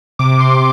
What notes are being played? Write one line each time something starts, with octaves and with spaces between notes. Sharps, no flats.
C3 D6
C6